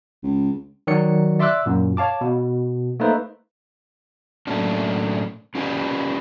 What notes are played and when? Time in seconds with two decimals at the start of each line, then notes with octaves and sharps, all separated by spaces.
0.23 C#2
0.87 D#3 F#3 F#4 D5 C#7
1.39 D5 E5 C6 D6 E6 F#6
1.66 F#2 A#2
1.97 C#5 F5 A5 D6
2.21 B2
3.00 A3 A#3 D#4 B4 C5
4.47 A2 F#3 A3 A#3 C#4 D4
5.55 C#4 F4 G4 B4 D5 G#5